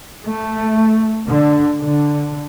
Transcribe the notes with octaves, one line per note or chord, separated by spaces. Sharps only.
A3
D3
D3